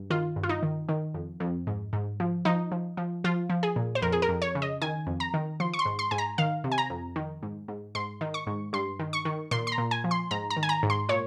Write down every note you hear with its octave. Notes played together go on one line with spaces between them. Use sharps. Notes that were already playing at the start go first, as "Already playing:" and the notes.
Already playing: G2
D#3 F4
G2
F4
D#4
D#3
D#3
F2
F2
G#2
G#2
F3
F3 D#4
F3
F3
F3 F4
F3
G#4
A#2
C5
F2 A#4
G#4
A#4
F2
C#5
C#3
D#5
D#3 G#5
F2
A#5
D#3
F3 C6
C#6
C6
G#2
C6
G#2 G#5
A#5
D#3 F5
C3
G#5
A#5
F2
D#3
G#2
G#2
G#2 C6
D#3
C#6
G#2
G2 C6
D#3
C#6
D#3
A#2 C6
C6
A#5
A#2
G#5
F3
C6
G#2 A#5
A#5
D#3
G#5
A#5
G#2
C6
A#2 C#5